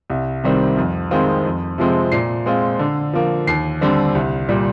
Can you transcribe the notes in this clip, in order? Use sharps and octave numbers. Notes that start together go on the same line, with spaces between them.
C2
C3 D#3 G3 C4
F2
D#3 G#3 C4 F4
F2
C3 F3 G#3 C4
A#2 C7
G#3 C4 F4
D3
F3 A#3
D#2 C7
D3 G3 C4
C2
A#2 G3